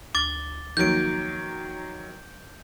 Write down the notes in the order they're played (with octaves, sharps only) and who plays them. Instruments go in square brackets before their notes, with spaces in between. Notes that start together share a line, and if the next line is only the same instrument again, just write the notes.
[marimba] D2 F6 [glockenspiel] D6 A6 G7
[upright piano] D#3 F#3 [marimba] F3 A#3 [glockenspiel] G6 D7